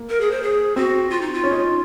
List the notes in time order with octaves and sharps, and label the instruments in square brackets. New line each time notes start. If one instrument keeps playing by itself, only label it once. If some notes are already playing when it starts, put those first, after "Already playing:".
Already playing: [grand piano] A#3
[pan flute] A#4
G#4
C5
G#4
[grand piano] C4 [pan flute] F#4
[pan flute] F4
D#4
F4
[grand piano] C#4
D#4
C#4